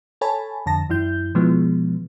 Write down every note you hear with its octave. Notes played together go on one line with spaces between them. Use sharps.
A4 C#5 G#5 A5 B5
F2 D3 A5 A#6
F#2 E3 E4 G6
B2 E3 F3 G#3 B3